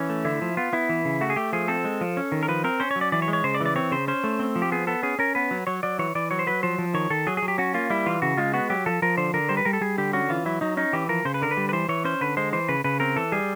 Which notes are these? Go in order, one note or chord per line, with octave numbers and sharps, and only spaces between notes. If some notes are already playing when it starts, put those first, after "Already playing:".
Already playing: E3 C#4
A3
D3 E4
F3
B3 F4
B3 E4
E3
C#3
A3 F#4
G#4
A3 G4
F3 G#4
C4 A4
G#3
F3
C#4
D#3
A#4
F3 B4
C4 A#4
C#4 C5
C#5
F#3
D5
E3 D5
C#5
G#3
C#5
C#3 C5
D5
E3
D5
C4 C#5
C#3 C5
C#4 C5
A3
C4
F3
G4
B3 G#4
B3 A4
C#4 G#4
C#4 A#4
B3 B4
F#3
F#3 C#5
F#3 D5
E3 C#5
E3 D5
F#3 C#5
C5
F#3 B4
F3 C5
F3
D#3 C#5
D#3 A4
F#3 G#4
G#4
F#3
G4
C#4 F#4
A#3 F4
G3 E4
E3 F4
C#3 F#4
G#3 F4
B3 F#4
F#3 G4
F3 A4
F3 A#4
D3 C5
D3 A#4
G3 C5
B4
G3 A#4
A4
G3 G#4
D3 G4
C#4 F#4
E3 F4
F#3 E4
F#3 D#4
C#4 D#4
E3 G4
F3 A#4
C#3 C5
B4
D3 A#4
B4
G3
B4
E3 C5
E3 C#5
C#4 C5
D3 B4
G#3 C5
E3 C5
C#3 B4
C#3 B4
C4 A#4
E3 A4
G3 G#4